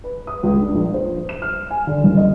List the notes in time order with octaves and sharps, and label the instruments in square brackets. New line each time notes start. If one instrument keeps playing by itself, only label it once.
[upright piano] B4
D#6
C#2
D4
A#1
C5
E7
F6
G#5
D3
F#1
D#5